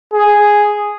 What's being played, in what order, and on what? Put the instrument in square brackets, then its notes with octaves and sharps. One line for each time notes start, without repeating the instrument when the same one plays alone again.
[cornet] G#4